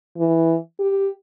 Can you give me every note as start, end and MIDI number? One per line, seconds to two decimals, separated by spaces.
0.17 0.57 52
0.79 1.09 67